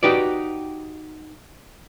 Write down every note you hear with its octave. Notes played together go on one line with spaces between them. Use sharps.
D#4 F#4 G4 B4 D5